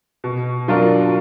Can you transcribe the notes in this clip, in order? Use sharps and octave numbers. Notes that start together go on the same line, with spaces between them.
B2
F#3 D4 F4 A#4